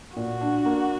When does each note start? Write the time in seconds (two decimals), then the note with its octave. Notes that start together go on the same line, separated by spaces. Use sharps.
0.16 A#2 F#4
0.41 D4
0.66 A#3